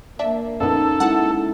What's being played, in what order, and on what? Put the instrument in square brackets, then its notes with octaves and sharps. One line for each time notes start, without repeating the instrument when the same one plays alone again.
[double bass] A#3 [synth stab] D4 E5
[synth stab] F2 A#2 B3 [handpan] C#4 D#4 [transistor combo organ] A4
[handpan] G#3 D#4 E4 [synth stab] F#5 A5